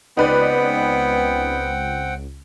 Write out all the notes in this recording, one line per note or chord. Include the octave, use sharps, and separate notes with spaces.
C#2 B3 C4 D#4 B4 D5 F#5 G5